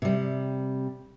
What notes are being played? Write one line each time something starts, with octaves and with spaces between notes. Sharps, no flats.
C3 G3